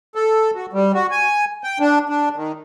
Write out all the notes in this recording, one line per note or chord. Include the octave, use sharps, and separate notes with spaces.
A4
F#4
G3
F#4
G#5
G5
D4
D4
D#3